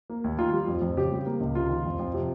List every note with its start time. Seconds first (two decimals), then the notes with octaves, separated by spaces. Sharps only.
0.10 A#3
0.24 D#2
0.38 D#3 F4
0.53 G3
0.67 F2
0.82 F2
0.97 C#3 G4
1.12 G3
1.26 A#3
1.41 C#2
1.55 C3 F4
1.70 D#3
1.85 F2
1.99 F2
2.14 C3